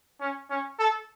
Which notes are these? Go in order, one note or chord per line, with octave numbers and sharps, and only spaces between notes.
C#4
C#4
A4